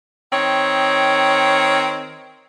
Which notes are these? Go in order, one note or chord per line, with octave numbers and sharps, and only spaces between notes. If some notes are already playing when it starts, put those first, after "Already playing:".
D#3 C4 C#5